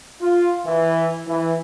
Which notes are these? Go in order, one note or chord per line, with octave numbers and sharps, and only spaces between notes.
F4
E3
E3